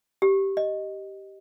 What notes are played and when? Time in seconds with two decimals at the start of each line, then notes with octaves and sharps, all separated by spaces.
0.22 G4
0.57 D#5